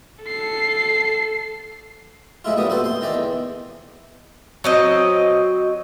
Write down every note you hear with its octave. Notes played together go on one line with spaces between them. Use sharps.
A4 C7
F3 G#3 A3 E4 F4
A1 A#2 G3 B3 D#6
F#4 A4 C5
C5 C6
D#3 E3 D5
E2
F#3 C4 D#5